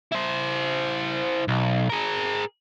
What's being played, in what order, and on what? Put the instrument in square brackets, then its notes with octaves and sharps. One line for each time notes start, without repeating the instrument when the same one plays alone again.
[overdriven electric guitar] E4 C5
B1
G#4 A#4